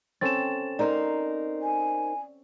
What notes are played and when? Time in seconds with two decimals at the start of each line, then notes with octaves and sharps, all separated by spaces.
0.21 C4 C#4 A4 A6 E7
0.79 D#4 A#4 C5 D5
1.62 G#5